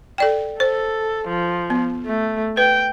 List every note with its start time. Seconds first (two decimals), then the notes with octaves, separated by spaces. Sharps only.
0.18 A4 D5 G5
0.60 A4 C5
1.28 F3
1.70 B3
2.06 A3
2.57 B4 G5